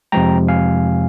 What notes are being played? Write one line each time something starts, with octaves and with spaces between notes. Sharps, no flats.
F2 C3 F3 G#3 G5 A#5
F5 G#5